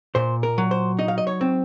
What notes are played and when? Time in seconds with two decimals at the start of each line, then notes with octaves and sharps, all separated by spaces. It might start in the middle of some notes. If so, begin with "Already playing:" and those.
0.15 A#2 C5
0.43 A#4
0.58 F#3
0.71 C5
0.99 D#4 D#5
1.08 F5
1.18 D#5
1.27 C#5
1.41 C4